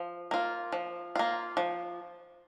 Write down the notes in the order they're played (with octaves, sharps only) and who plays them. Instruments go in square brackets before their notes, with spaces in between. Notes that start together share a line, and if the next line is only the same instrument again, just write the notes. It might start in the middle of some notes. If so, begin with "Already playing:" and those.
Already playing: [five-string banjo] F3
A#3 F4
F3
A#3 F4
F3